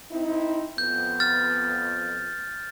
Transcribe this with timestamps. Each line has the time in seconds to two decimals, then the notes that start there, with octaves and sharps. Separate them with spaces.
0.12 C4 D#4 E4
0.78 F2 B3 G6
1.20 F6 A6